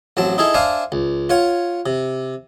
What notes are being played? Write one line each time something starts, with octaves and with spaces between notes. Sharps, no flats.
A1 F#3 C4 A5
D#4 E4 G#4 A4 E5
D4 C5 E5 F5 G#5 A5
C#2
F4 C#5 F#5
C3